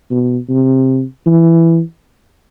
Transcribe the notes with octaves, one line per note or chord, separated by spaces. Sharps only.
B2
C3
E3